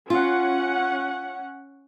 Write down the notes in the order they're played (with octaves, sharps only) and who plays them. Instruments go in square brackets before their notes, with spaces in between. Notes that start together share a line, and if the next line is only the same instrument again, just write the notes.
[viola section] C#4 F#5 [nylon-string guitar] F4